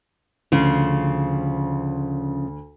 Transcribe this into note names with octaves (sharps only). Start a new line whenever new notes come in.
D2 C#3 F3 C#4